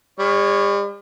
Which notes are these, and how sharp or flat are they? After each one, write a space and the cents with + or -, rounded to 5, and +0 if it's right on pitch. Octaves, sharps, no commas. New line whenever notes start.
G3 +45 C#5 +0